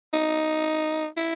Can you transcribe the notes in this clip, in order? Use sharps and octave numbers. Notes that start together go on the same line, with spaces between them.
D#4
E4